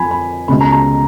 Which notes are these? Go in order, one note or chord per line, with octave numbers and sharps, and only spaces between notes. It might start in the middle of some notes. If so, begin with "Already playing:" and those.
Already playing: F2 F3 G#5 B5
B5
C#2 B2 G#3 B5
A#5
A#5